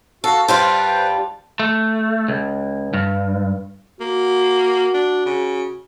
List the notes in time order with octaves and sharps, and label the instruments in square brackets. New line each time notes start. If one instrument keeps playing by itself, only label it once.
[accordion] F#4 F5 [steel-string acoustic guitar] A4 [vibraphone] A5
[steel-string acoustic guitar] G2 G3 F4 [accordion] B4 C5 G5
[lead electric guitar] A3
C#2
G2
[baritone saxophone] A#3 [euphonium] F#4
[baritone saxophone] D4
C#3